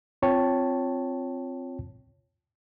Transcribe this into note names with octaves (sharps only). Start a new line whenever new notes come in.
C4 F4 C#5 G5 A5